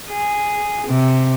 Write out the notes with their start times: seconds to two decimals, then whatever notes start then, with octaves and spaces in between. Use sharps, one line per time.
0.10 G#4
0.88 C3